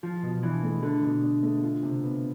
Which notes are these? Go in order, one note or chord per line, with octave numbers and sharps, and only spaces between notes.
F3 F4
B2
E3 D4
A3
D3 A4
B2
D4
A3
F4
C3
B3